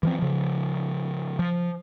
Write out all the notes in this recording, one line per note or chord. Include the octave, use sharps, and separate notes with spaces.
E3 F3 C4
C#3 F3
F3